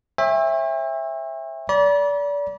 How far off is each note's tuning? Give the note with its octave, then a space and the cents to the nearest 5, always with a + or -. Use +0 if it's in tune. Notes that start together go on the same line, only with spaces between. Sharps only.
C#5 -40 E5 +0 G5 +45
D5 -30 B5 -45